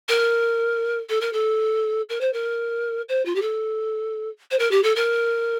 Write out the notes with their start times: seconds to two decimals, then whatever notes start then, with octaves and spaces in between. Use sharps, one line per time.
0.09 A#4
1.09 A4
1.21 A#4
1.33 A4
2.09 A#4
2.20 C5
2.33 A#4
3.09 C5
3.25 F4
3.35 G4
3.41 A4
4.51 C5
4.59 A#4
4.71 G4
4.83 A4
4.96 A#4